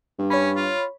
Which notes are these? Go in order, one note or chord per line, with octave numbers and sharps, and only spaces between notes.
G2
C#4 C#5 B5
F4